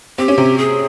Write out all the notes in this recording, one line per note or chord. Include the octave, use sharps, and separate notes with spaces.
C4 G4
C#4
C3 C4
G#4